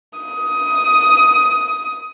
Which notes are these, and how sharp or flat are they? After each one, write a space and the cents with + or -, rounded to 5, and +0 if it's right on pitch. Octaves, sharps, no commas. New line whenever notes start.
D#6 +15